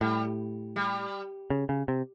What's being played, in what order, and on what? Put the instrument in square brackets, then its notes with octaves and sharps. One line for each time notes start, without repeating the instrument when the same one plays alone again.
[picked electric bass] A2 [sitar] G3
[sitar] G3
[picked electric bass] C#3
C#3
C3